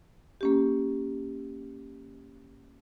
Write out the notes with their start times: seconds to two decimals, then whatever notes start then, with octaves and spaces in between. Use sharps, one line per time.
0.41 A#3 C#4 G4